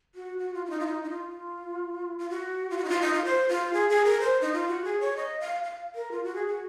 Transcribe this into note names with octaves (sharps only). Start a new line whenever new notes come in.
F#4
F#4
F4
F4
D#4
F4
D#4
D#4
F4
F4
F#4
F4
F#4
D#4
F4
D#4
F4
C5
F4
G#4
G#4
A#4
C5
D#4
F4
F#4
G#4
C#5
D#5
F5
F5
A#4
F4
F#4
G#4
F#4